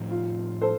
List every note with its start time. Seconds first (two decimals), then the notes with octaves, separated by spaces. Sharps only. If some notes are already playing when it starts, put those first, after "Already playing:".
Already playing: A2 F3 C4 D#4
0.11 F4
0.62 A4 C5